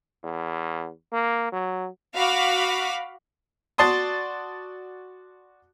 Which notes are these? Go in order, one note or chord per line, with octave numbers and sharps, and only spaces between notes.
E2
A#3
F#3
F#4 F5 B5 D6
F#4 D5 A5 C6 D#6